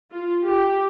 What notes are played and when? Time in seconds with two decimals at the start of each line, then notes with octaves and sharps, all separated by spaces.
0.12 F4
0.44 G4